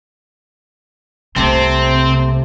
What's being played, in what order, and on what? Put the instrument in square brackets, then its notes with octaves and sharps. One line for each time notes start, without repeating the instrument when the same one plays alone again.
[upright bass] C2 A#3 [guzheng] C3 A3 [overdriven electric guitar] C4